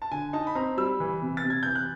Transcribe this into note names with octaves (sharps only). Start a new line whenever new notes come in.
A5
D3 G#5
D#4 A5
B5
C4 A#5
G3 E6
E3
C3
A6
C3
G#6
E3 G6
F#6